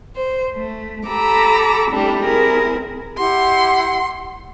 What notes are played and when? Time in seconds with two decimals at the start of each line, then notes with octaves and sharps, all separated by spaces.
0.14 C5
0.54 A3
1.06 G4 A4 A#5 B5 D6 E6
1.90 G3 A3 C4 D4 E4
2.24 C4 E4 G#4 A#4
3.18 E4 G4 F#5 C6